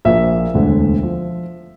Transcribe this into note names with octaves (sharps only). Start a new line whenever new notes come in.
A#1 A#2 F3 A#3 E5
E1 D2 D3
F3